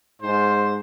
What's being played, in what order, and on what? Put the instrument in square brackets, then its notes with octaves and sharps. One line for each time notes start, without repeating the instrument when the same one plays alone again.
[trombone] G#2 [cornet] C5